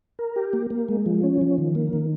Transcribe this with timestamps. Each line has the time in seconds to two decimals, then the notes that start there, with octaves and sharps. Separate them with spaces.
0.19 A#4
0.36 G4
0.53 A#3
0.70 A#3
0.89 G#3
1.06 F3
1.23 C#4
1.41 F3
1.58 D#3
1.75 A#3
1.93 D#3